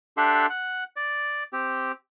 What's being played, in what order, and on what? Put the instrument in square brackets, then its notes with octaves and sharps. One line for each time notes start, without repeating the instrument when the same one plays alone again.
[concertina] D4 G4 A4 E5 F#5 C6
F#5
D5
C4 G4